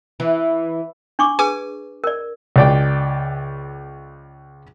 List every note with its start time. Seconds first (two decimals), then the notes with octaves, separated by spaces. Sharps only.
0.20 E3
1.19 D4 C#6 D6
1.39 G#4 B4 G#5 D6
2.04 A#4 D5
2.56 C#2 D5 G5